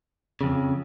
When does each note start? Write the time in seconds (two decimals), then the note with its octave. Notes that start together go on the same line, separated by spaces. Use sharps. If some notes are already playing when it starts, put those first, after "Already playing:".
0.41 F2 C#3